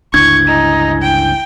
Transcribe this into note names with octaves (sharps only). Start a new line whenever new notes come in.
G1 C#2 D4 E4 C#6 G#6
D#4 E4 G#5
G5